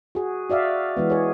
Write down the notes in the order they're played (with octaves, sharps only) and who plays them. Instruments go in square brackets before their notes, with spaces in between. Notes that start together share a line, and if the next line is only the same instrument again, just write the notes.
[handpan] F#4 G#4
F#4 D5 E5 F5
E3 G#3 B3
G#4 C#5